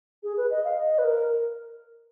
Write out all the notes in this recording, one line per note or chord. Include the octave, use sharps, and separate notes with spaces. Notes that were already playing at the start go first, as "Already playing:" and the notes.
G#4
B4
D#5
F5
D#5
B4
A#4